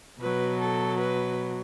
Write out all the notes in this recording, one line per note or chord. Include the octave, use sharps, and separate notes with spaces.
B2 F#3 B4
A4
B4